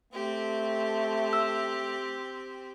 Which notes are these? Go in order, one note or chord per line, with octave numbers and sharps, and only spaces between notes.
A3 C4 G4
E6